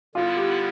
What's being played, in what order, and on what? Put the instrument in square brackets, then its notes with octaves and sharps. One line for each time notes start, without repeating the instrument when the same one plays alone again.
[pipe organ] D3 G3 B3 E4 [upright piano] F4
[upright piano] G4